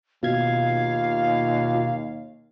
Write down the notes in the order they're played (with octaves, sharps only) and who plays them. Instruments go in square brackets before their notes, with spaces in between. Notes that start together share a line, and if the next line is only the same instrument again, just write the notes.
[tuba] D#2 [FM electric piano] B2 G#6 [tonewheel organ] F4 [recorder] F5